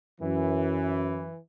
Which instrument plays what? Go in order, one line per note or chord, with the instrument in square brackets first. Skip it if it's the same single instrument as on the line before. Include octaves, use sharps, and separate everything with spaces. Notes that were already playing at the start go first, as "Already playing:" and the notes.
[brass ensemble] F#2 [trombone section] E3